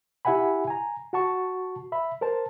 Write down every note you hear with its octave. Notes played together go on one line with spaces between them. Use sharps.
E4 G4 E5 F#5 G#5 B5
G#5 A#5
F#4 F#5 A5 C#6
E5 B5
A#4 C5 A5